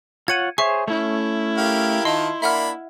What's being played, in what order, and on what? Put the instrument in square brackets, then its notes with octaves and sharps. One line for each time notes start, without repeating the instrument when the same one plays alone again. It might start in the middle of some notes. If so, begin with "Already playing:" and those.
[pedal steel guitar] F4 C#5 F#5 [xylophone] G#6 C#7 D#7
[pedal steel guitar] G#4 C5 C#5 [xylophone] E5 C#6
[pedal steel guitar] A3 C#4 [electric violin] E4
[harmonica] G4 A#4 F5
[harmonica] D#3 F4 A5 [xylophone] D#5 [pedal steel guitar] C6
[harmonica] A#3 D4 B5 [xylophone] E5 F#5 F6